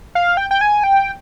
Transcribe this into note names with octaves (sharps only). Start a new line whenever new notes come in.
F5
G5
G5
G#5
G5